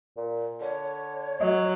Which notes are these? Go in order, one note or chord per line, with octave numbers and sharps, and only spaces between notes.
A#2
D3 C#5
F#3 D#5